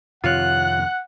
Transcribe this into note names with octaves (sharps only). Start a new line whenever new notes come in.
F2 C3 D#3 F4 C#5 F#5 F#6